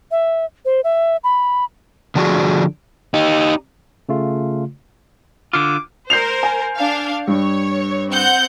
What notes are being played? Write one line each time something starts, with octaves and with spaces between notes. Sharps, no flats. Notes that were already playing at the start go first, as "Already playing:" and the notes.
E5
C5
E5
B5
D3 F3 D4 F4 F#4 G#4
D#4 G4
C#3 A3 F4
D3 F4 D6
A#4 C5 G6 C7 F7
G#5
D4 F5
G2 C#5
C4 F#5 G6